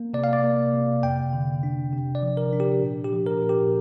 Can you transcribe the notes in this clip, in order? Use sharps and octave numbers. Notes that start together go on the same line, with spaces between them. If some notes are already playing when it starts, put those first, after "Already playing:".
Already playing: A#3
C3 D5
F5
D5
A#3
C3
F2 G5
D3
D4
C3
D5
F3
A#4
D4
G4
A#2
G4
F3
A#4
A#2
G4